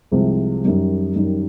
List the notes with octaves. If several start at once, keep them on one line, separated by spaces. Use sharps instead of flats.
C2 C3 F3 G#3
F#2 D#3 G3
F#2 D#3 G3